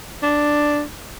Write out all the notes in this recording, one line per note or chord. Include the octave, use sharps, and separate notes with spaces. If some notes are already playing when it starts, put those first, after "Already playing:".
D4